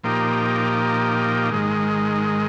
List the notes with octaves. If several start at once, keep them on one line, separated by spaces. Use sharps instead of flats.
A#2 F3 A#3 D#4 G4
G#2 D#3 G#3